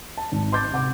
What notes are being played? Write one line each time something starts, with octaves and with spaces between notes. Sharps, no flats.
A5
G#1
C6 D6 G6 A6
C3 F#5 D6